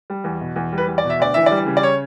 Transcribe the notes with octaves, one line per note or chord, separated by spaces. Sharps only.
G3
E2
B2
E2
G3
B4
E2
D5
B2
E5
D2 D5
E3 E5
D5
G3
C#3
D5
C#5